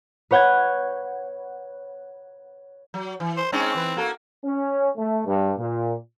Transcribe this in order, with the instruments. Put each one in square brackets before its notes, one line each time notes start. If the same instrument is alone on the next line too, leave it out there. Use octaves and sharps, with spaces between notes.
[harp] B4 C#5 F#5 G6 G#6
[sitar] F#3
E3
[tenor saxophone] C5
[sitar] G#3 C#4 D#4 [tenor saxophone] C4
[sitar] E3 B4
A#3 F#4 A4
[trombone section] C#4
A3
G2
A#2